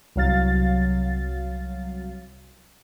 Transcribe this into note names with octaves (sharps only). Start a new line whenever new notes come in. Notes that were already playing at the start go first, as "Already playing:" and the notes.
C2 F#3 F5 A6